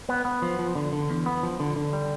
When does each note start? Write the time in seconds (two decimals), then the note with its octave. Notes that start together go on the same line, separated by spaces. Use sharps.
0.09 B3
0.25 B3
0.42 F3
0.59 F3
0.75 D3
0.93 D3
1.10 E2
1.26 B3
1.43 F3
1.60 D3
1.76 D3
1.93 G3